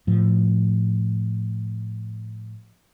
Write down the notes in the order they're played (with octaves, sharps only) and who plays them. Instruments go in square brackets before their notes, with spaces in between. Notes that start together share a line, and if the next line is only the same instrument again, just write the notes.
[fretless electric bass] A2 F3